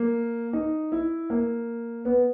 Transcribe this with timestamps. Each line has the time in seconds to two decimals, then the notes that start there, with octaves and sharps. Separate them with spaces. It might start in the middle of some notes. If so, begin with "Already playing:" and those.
Already playing: A#3
0.53 D#4
0.92 E4
1.30 A#3
2.05 B3